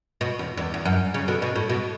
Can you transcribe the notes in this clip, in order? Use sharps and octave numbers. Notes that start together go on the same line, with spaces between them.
B2
E2
E2
E2
F#2
C#3
B2 D3
B2
A2
B2